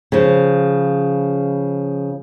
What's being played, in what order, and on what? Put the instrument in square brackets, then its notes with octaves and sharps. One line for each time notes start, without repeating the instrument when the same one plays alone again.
[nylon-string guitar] C#3 F3